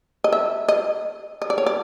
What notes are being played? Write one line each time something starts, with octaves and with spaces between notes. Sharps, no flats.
D#5
E5
D#5
D#5
D5
C#5
D5